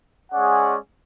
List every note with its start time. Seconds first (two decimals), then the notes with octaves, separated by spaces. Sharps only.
0.32 G#3 C#4 G#4 D5 F#5